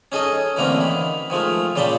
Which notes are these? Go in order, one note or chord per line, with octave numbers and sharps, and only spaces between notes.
C#4 D#4 G#4 A4 D#5
F#2 D3 E3 A3 A#3 C4
D#3 B5
D#3 F3 G#3 A3
A#2 C#3 D5 G5 A5 B5